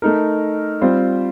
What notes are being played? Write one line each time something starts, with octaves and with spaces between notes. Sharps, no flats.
A3 D#4 A#4
G3 C4 F4 C5